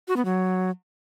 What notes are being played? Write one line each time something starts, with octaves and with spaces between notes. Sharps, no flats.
F#4
B3
F#3